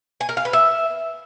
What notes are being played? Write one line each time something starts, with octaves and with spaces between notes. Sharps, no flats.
G#5
A#4
F5
B4
E5